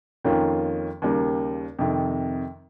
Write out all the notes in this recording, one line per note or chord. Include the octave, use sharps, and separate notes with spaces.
F2 D#3 A#3 C#4 F4
D#2 C#3 G3 A#3
F2 C3 D#3